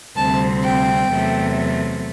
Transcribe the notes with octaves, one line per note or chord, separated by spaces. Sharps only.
D2 C3 G3 C4 A5
G5
E2 C3 F#3 A3